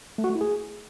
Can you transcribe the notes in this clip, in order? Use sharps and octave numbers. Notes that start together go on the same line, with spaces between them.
A3
F#4
A3
E4
G#4